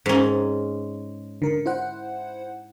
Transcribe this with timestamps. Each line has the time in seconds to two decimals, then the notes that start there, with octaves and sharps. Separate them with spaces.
0.06 G#2 C#4
1.42 D3 A#4
1.66 E4 C5 F#5